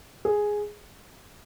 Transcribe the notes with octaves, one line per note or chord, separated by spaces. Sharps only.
G#4